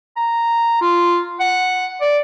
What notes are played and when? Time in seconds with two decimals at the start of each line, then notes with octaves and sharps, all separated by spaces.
0.17 A#5
0.81 F4
1.40 F#5
2.01 D5